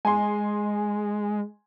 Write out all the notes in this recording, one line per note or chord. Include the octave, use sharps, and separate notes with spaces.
G#3 G#5 C6